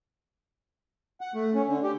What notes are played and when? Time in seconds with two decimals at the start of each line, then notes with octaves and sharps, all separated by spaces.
1.21 F#5
1.34 A3
1.54 C#4
1.66 D3
1.84 G4